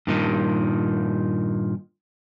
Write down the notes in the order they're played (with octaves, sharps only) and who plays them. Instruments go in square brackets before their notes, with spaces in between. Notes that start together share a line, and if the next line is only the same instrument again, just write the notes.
[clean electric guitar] G2 A#2 D#3